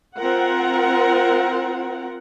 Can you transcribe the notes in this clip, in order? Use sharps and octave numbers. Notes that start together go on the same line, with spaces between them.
C4 F4 A#4 F#5